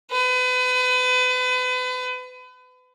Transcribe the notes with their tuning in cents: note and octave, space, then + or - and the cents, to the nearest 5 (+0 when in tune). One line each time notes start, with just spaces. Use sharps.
B4 +35